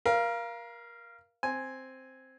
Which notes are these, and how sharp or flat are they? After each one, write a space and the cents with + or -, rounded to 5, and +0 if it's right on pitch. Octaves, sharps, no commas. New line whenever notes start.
A#4 +25 F5 -15
C4 +0 G#5 +0